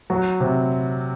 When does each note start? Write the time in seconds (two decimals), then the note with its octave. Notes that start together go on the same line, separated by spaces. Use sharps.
0.10 F#3 F#4
0.40 C3